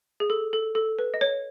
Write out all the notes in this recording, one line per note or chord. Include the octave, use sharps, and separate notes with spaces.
G#4
A4
A4
A4
B4
D#5
C#5